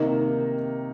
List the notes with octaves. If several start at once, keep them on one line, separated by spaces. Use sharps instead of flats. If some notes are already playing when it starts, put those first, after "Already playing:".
Already playing: C3 D#3 A#3 D#4 A#4